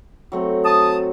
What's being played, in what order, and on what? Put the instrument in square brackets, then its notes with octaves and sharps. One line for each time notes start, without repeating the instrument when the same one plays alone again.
[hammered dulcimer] F#3 A3 C4
[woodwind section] A5 D#6